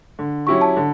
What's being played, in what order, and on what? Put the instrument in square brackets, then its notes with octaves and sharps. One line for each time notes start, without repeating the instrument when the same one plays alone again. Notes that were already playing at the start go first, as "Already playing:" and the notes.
[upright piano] D3
[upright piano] F#3 C#4 E4 G4 [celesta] C#6
[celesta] A5
[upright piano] D3